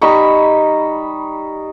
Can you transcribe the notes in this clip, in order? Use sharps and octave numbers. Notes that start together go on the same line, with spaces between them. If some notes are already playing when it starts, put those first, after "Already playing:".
G3 D#4 B5 C#6